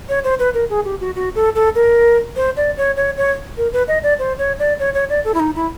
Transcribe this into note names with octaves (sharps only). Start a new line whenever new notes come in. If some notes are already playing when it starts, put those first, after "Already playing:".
C#5
C5
B4
A#4
G#4
G4
F#4
F#4
A4
A4
A#4
C5
D5
C#5
C#5
C#5
A#4
B4
D#5
D5
C5
C#5
D5
C#5
C#5
D5
A4
E4
D#4
E4